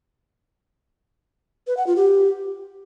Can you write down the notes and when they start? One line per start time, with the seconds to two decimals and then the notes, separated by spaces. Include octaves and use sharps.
1.67 B4
1.77 F#5
1.87 F4
1.96 G4